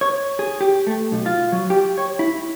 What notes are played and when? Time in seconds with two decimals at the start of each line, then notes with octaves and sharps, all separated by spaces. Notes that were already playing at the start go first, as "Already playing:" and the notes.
0.01 C#5
0.39 G#4
0.61 G4
0.87 A3
1.12 B1
1.26 F4
1.52 F#3
1.70 G4
1.98 C#5
2.19 E4